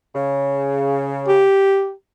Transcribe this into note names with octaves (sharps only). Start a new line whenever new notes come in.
C#3
G4